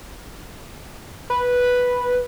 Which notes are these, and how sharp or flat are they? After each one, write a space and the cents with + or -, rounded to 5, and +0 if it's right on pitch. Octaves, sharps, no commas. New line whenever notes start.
B4 -5